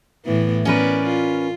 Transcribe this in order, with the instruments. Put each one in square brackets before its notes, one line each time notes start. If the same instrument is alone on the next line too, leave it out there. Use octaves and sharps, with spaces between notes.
[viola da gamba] A2 E3 B3
[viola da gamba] B3 D5 [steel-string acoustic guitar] C#4 A#4 B4
[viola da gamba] F4